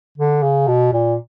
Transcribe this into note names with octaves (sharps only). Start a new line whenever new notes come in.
D3
C#3
B2
A#2